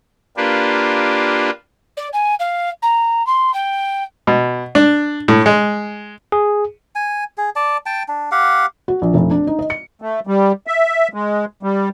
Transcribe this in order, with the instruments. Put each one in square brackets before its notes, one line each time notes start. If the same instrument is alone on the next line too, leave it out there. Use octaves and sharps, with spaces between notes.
[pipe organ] A#3 D4 F4 G4 B4
[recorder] D5
G#5
F5
A#5
C6
G5
[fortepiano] B2
D4
A2
G#3
[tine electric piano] G#4
[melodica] G#5
G#4
D5 A5
G5 A5
D4
G4 F5 F#5
[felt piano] F#4
A#1
F1
D4
D#4
D#5
C#7
[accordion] A3
G3
E5
G#3
G3